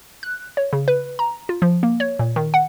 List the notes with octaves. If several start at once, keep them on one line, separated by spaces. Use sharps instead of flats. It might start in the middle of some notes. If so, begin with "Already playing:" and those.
F#6
C#5
C#3
B4
A#5
F4
F3
A#3
C#5
A#2
D#3
F#5